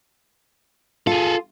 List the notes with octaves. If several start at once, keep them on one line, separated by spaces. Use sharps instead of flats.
F4 G#4 A4